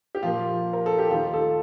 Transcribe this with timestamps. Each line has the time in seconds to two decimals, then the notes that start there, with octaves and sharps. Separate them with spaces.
0.15 G4
0.23 A#2 F3 A#3 F4
0.73 A#4
0.86 A4
0.98 G4
1.11 D#2 D#3 A3 F4
1.33 A4